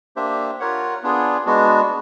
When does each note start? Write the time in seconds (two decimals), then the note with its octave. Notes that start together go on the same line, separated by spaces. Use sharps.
0.16 A#3 D4 G4 C5 E5
0.60 F4 A#4 C#5 F#5
1.03 B3 D4 F4 G#4
1.46 G#3 B3 D4 F#4